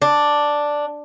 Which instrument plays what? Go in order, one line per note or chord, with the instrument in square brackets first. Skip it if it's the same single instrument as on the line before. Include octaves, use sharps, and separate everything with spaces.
[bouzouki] D4